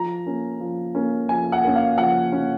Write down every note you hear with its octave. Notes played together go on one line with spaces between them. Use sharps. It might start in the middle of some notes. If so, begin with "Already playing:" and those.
Already playing: F3 A#5
A#3 C#4
F3
A#3 C#4
F3 G#5
F#5
A#3 C#4
F5
F3 F#5
A#3 C#4